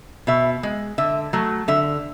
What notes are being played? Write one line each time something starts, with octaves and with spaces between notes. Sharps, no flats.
B2 E5
G#3
D3 E5
F#3 A3
D3 E5